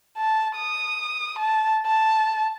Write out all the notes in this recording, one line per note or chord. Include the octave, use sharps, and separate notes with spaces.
A5
D#6
A5
A5